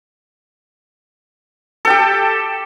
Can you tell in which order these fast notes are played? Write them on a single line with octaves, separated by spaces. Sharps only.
A4 G5 G4